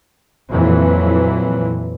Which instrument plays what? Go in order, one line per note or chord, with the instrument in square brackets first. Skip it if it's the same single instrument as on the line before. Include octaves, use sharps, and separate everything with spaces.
[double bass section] F2 A#2 E3 F#3